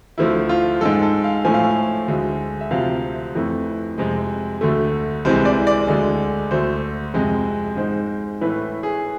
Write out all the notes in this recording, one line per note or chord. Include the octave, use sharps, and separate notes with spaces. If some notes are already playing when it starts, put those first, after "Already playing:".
D2 D3 F3 A3 E4
F4
G#2 G#3 A4
A4
F5
A2 F3 A3 G#5
F5
G#5
D2 D3 G#3
E5
D2 C3 F3 F5
F2 E3 A3
F2 C3 G#3
D2 D3 A3
C2 C3 E3 G#3 C5
D5
D5
D2 D3 G#3
D2 D3 A3 C5
F2 C3 G#3
G#2 G#3 C5
A2 E3 A3 B4
G#4